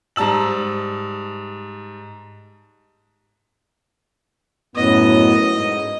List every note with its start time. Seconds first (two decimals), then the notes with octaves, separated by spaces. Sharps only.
0.16 G#2 G3 A5 E6 F#7
4.76 F#2 A2 B3 D#5
5.51 G#2